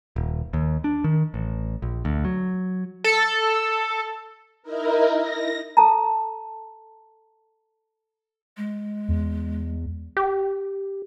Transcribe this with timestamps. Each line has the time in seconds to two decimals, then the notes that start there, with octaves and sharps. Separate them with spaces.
0.16 D#1
0.53 D#2
0.84 D4
1.04 D#3
1.34 A1
1.82 A#1
2.05 D2
2.25 F#3
3.04 A4
4.62 D#4 E4 A#4
5.15 A#6
5.77 A4 A5 A#5
8.57 G#3
9.08 E2
10.17 G4